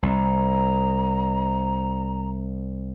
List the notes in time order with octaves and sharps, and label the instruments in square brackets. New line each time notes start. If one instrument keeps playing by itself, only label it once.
[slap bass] C2 [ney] A#5